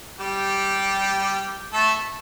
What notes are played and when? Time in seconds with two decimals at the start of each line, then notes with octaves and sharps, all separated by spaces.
0.19 G3 G4
1.73 A3 A4